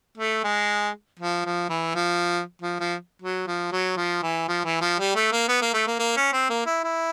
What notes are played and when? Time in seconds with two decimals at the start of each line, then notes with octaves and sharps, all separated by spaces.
0.18 A3
0.44 G#3
1.20 F3
1.45 F3
1.69 E3
1.95 F3
2.62 F3
2.80 F3
3.22 F#3
3.47 F3
3.72 F#3
3.97 F3
4.23 E3
4.48 F3
4.65 E3
4.82 F3
4.99 G3
5.16 A3
5.32 A#3
5.49 B3
5.62 A#3
5.74 A3
5.87 A#3
5.99 A#3
6.17 C#4
6.33 C4
6.50 A#3
6.66 E4
6.84 E4